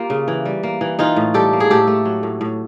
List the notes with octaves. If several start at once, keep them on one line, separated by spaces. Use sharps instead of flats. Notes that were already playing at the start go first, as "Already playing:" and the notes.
Already playing: A#3 F4 G4
C#3
E3
G3
A#3
E3
E3 D#4 F4
A2
G3 G4 A4
A#3
G#4
A2 G4 A4
A3
F#3
A2
A2